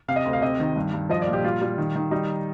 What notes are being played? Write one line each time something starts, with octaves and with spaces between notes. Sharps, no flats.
C3 F5
D#5
D2
F5
C3 D#5
D#3
G2
G2
F3 D#5
D5
A#2
G4
G3 F4
G3
D#3
D#3
G3 D#4